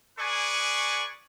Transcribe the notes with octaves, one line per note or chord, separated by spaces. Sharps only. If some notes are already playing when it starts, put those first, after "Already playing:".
G#4 B4 D5 G#5 C#6